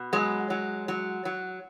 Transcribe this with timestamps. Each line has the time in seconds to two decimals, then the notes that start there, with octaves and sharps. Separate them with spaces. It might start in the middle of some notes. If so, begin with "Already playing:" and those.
Already playing: B2
0.13 F#3 G#3
0.50 F#3
0.88 F#3
1.25 F#3